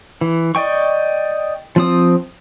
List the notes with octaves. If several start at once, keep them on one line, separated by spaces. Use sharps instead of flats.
E3
D5 D#5 G5 C#6
F3 C4 D#6